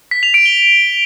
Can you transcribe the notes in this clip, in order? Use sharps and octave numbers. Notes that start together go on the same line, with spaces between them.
B6
F7
D7
G7